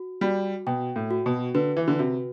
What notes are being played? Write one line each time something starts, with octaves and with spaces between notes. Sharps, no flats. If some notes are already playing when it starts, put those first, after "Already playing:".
Already playing: F#4
G3 F#4
B2 G5
A2
F#4
B2
D3 B4
E3
D3
C3 F#4